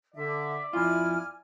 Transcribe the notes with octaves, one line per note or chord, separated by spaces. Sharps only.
D3 D5 E5
F2 E4 F4 G#5 F6